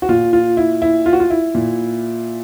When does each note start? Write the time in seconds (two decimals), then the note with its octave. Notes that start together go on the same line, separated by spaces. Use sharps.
0.02 F#4
0.09 A#2 F4
0.33 F4
0.57 E4
0.82 E4
1.06 F4
1.13 F#4
1.20 F4
1.30 E4
1.55 A#2